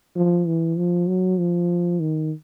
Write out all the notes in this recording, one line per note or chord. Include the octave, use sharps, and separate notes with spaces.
F3
E3
F3
F#3
F3
D#3